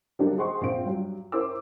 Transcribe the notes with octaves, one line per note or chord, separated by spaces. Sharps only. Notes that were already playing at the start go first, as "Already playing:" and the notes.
D3 F#3 G3 A#3 D4 D#4
G#4 C5 D#5 F#5 C6 C#6
A#1 C4 F4 D7
G2 F#3
C#4 E4 A#4 C5 D6 E6